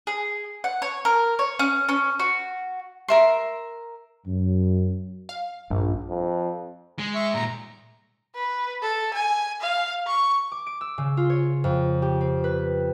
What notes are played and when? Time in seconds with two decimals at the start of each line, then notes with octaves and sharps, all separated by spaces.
0.07 G#4
0.64 F#5
0.82 C#5
1.05 A#4
1.39 C#5
1.59 C#4
1.89 C#4
2.20 F#4
3.08 A#4 E5 C6
4.27 F#2
5.29 F5
5.70 A#1 G2
6.10 F2
6.99 G#3
7.15 E5 C#6
7.34 A#2 G3 A#5
8.35 B4
8.82 A4
9.14 G#5
9.61 F5
10.07 C#6
10.52 D6
10.66 D7
10.81 E6
10.98 C#3
11.17 F4
11.30 C#5
11.64 F2
12.02 G4
12.21 C4
12.44 B4